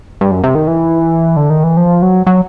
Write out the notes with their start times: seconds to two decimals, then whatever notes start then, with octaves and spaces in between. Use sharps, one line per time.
0.21 G2
0.31 F#2
0.43 C3
0.55 D#3
0.68 E3
1.37 D3
1.50 D#3
1.64 E3
1.77 F3
2.02 F#3
2.27 F#3